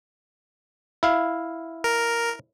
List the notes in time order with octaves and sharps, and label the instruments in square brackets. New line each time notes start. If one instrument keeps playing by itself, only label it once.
[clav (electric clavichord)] E4 F5
[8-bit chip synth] A#4